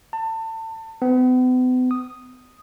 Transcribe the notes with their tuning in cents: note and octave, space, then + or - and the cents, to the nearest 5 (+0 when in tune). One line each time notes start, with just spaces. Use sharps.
A5 +30
B3 +40
D#6 -5